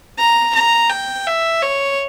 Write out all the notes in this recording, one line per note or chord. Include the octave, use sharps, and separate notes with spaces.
A#5
A#5
G5
E5
C#5